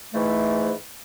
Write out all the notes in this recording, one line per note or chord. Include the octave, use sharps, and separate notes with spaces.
G#2 E3 A3